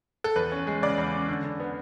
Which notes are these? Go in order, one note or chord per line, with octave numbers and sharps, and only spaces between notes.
A4
E2 B4
C#4
G#3
C#3 D5
E2
C#4
D3
D3
B3